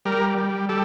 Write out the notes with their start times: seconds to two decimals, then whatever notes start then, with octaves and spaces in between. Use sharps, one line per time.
0.05 G3 A#4
0.38 G3
0.69 G3 A4